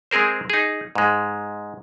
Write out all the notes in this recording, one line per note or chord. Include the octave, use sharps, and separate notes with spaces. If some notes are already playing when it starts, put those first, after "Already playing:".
G#3 C4 G#4 A#4 C5
D#4 G#4
G#2 G#3